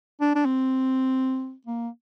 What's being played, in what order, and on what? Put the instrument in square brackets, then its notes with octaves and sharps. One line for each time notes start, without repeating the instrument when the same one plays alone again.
[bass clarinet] D4
D4
C4
A#3